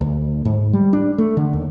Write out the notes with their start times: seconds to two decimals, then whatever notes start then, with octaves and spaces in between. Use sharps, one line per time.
0.01 D2
0.45 G#2
0.73 G3
0.93 D4
1.18 A3
1.37 D3
1.53 D#2